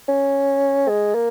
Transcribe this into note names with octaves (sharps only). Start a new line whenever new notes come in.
C#4
G#3
A#3